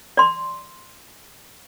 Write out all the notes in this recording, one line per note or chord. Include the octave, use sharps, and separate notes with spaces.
D5 C6